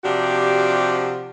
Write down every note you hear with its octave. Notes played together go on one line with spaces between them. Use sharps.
C3 F3 D4 F#4 G4